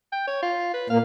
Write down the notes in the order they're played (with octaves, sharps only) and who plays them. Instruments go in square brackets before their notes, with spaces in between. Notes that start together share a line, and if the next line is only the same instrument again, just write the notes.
[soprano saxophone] G5
C#5
F4
B4
[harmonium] A#2 A#3 [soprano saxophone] F5